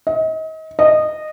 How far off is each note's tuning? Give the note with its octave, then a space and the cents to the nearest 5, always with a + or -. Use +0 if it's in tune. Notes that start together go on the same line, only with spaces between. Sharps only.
D#5 +35
D#5 -15